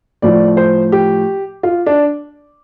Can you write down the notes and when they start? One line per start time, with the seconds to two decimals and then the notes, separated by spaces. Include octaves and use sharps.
0.22 A2 F3 D5
0.57 C5
0.92 G4
1.63 F4
1.86 D4